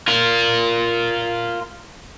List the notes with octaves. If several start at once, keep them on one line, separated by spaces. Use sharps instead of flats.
F4 A#4